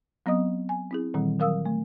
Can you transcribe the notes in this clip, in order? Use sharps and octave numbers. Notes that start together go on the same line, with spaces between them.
F#3 B3 C4 D#5 D#6
G#5
C4 E4 G#4
A#2 D#3 E3 G3 C4
D#3 F#3 A#4 F5 D#6 E6
A3